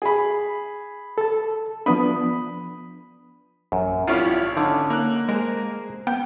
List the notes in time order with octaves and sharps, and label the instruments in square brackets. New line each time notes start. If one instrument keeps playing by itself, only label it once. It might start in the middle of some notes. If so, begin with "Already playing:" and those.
[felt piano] G#4 B5
[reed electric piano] A4 A5
[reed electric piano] F3 B3 D4 [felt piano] B5 D#6
[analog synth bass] A#1 [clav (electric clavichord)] F#2
[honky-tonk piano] G#1 C#5 F6 [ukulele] D4 E4 G4 [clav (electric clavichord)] F4
[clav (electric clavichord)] D3 [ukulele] C#4 D#4
[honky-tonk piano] A#3 F#6
[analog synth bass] G#3 [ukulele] G#4 C5 [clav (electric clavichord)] A#4
[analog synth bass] B3 [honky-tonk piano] G5